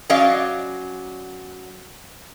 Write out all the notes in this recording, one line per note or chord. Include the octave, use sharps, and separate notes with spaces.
F#3 C#4 D5 D#5 F5